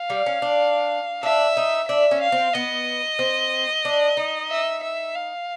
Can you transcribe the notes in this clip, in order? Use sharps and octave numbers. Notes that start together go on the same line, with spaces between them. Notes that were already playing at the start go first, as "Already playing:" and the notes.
Already playing: F5
G3
C#4
D4
D4 E5
D#4
D4 E5
C#4
F5
C4
B3 D#5
C4
D4
D#4
E5
E5
F5